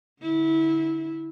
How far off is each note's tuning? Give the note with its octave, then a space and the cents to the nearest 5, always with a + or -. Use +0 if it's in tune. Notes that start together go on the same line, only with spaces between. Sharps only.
D3 +0 E4 -20